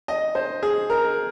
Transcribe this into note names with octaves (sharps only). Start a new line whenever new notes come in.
D#5
C5
G#4
A#4